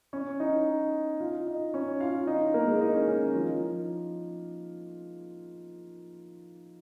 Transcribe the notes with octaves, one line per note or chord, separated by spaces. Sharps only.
C#4 C#5
D#4 D#5
F4 F5
D#4 D#5
C#4 C#5
F4 F5
D#4 D#5
A#3 A#4
G#3 G#4
D#4
C#4
C#4
D#4
F3 F4
D#4